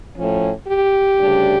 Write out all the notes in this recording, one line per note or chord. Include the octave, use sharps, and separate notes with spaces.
A2 F3 C#4
G4
D2 C#3 G3 D4